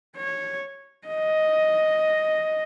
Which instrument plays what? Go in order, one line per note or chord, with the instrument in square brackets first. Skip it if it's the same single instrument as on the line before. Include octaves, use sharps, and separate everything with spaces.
[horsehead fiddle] C#5
D#5